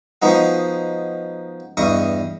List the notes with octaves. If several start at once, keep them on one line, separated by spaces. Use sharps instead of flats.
F3 G#3 B3 D#4 F#4
E2 G2 D#5 C#6 D#6